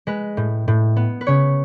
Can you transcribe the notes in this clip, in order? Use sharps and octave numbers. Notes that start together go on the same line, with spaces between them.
G#3 B4
A2
A2
B3
B4
C#3 C#5